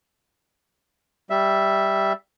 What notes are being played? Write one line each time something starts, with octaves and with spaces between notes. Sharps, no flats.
G3 E5